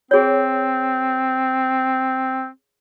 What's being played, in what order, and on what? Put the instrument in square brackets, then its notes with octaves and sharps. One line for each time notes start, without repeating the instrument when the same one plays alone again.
[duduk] C4 [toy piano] G#4 C#5